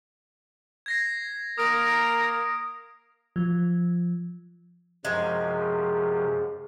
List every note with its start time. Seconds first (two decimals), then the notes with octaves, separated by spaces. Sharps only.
0.86 G#6 A#6 C7
1.58 A#3 A#4 D#6 D7
1.86 D7
3.36 F3
5.05 F#2 C3 F3 G#3